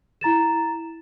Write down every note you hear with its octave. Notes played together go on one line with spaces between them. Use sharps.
E4 A#5 A6 E7